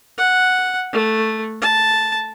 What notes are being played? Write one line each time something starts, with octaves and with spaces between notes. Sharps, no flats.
F#5
A3
A5